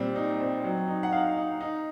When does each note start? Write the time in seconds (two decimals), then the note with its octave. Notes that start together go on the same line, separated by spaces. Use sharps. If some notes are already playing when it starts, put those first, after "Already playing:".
Already playing: A#2 G3 C4
0.15 D#4
0.40 C4
0.64 F#3
0.88 D#4
1.03 F#5
1.12 D#4 F5
1.37 D#4
1.61 D#4